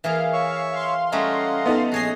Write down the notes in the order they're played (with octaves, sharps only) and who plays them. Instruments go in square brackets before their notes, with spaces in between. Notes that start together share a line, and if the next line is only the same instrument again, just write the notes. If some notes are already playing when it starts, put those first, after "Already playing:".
[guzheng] E3 A#3 G#4 [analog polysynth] F5
[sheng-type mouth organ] C#5 E5 C#6
[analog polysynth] F5 C6
[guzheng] G3 A3 C#4 [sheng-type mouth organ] D#5 F#5 A#5
[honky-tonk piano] B3 D#4 A4
[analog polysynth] A#1 G#4 C7 [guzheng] F#4 C#5 D#5